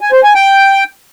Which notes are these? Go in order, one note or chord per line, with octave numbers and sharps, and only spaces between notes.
G#5
C5
G#5
G5